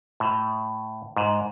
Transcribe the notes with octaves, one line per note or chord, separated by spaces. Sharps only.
A2
G#2